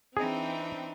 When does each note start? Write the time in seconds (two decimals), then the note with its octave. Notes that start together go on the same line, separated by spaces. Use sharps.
0.17 E3 C4 D4 D#4 G#4 G5